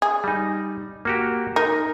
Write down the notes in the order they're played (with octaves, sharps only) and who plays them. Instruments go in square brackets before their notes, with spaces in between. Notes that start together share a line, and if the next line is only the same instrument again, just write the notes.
[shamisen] G#4
[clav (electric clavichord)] G3 D#4
A#3 F#4 G4
[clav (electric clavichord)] D#4 [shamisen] A#4